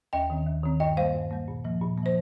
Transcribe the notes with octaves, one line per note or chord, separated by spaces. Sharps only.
D#2 D#5 G5
D#3 C4
D#2
D#3 C4
G2 D#5 G5
G3 A#3 C5 F5
G2
G3 A#3
A#2
F3 A#3
A#2
A#3
F3 C5